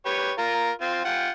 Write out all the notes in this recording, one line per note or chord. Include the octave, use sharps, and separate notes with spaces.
G4 B4 C#5
F4 A#4
C4 F4
F4 F#5 G5